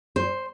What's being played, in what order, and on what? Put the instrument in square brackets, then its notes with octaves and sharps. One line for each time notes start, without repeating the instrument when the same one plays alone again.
[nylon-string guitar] C5